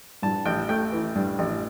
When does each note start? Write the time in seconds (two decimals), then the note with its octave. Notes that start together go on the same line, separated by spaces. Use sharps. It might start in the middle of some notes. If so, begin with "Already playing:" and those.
0.22 G2 A5
0.46 A1 G5
0.69 A3 G5
0.92 E3
1.15 G2
1.39 A1